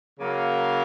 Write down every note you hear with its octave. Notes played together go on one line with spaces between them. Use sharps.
C#3 F#3 A#3